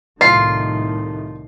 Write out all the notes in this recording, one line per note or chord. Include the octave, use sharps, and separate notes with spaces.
C2 A2 D#3 F4 C7